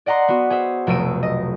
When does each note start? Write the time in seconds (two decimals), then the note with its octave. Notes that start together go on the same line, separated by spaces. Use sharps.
0.06 D5 D#5 F#5 A#5 C6
0.28 B3 F#4
0.50 G#4 C5 E5
0.87 F1 B1 A3 E6 D7 D#7
1.23 D#5